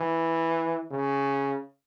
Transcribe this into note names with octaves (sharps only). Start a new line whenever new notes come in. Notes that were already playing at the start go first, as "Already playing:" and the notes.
Already playing: E3
C#3